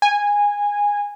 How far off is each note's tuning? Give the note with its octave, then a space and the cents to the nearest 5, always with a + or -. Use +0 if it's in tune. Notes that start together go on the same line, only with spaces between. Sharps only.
G#5 -15